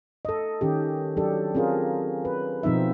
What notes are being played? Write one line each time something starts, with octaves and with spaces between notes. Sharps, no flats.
A4 D#5
D#3 C#4 G4
F#3 D4 G4 A4
C4 C#4 F4 G#4 A#4
B4
B2 F3 C4 D#4 E5